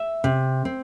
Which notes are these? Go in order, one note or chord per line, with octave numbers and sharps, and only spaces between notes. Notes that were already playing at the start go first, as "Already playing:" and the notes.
Already playing: E5
C3
C4